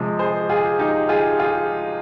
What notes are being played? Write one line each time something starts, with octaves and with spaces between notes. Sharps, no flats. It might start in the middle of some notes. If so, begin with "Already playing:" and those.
Already playing: C3 F3 G#3
G#4 C5
F4 G#4
D#4 G4
F4 G#4
F4 G#4